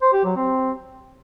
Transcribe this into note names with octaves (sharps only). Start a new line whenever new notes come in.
C5
G4
F#3
C4